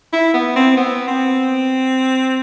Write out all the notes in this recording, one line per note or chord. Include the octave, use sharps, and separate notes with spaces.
E4
B3
C4
B3
C4